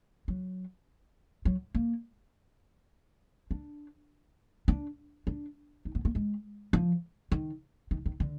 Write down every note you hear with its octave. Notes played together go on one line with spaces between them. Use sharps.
F#3
F#3
A#3
D4
D4
D4
D#4
B3
A#3
G#3
F3
D#3
D#3
D#3
D3